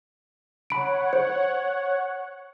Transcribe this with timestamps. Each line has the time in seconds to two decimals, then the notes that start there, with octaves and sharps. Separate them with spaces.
0.70 C#5 F#5 B5 D7
1.13 C5